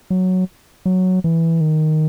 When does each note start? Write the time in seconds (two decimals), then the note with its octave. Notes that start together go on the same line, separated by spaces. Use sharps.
0.10 F#3
0.86 F#3
1.24 E3
1.61 D#3